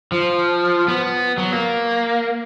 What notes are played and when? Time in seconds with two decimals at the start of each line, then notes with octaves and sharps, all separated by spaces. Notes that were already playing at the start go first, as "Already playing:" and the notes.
0.12 F3
0.88 B3
1.38 F#3
1.53 A#3